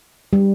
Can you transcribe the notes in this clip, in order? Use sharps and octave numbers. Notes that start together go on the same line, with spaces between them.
G3